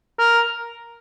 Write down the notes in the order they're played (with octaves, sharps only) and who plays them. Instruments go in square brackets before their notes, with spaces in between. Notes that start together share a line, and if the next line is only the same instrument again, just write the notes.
[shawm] A#4